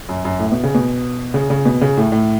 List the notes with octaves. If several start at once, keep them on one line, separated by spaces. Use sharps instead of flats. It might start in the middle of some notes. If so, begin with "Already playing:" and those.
F#2
F#2
A2
B2
C#3
B2
C#3
C#3
B2
C#3
A2
A2